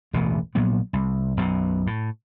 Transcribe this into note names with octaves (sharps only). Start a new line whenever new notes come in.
E1 A1 D2 B2
A#1 A#2 F#3 B3
C2
B1 F#2 B2
A2